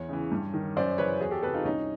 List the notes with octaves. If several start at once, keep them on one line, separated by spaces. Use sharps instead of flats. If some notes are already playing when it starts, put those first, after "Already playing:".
Already playing: E2 C#5
C#3 E3
G2
D#3
F#2 C5 D5
C#3 E3 B4 C#5
E2 F#4 G#4
G4 A4
C3 E3 A4 B4
D#4 F4
C2 C#4 D#4